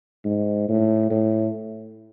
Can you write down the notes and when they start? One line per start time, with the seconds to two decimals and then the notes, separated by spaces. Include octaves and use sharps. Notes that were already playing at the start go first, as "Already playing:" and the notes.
0.25 G#2
0.69 A2
1.11 A2